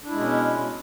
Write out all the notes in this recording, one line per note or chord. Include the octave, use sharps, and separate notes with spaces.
B2 G#3 C#4 D4 E4